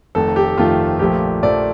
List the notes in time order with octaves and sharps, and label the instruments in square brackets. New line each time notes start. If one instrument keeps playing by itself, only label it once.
[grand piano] F1 F2 D#3 A3 A4
G4
F1 F2 D#3 A3 F4
A#1 A#2 F3 A3 G4
A#1 A#2 F3 A3 D5